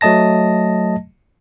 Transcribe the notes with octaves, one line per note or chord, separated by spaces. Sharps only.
F#3 A3 D#5 A5 A#6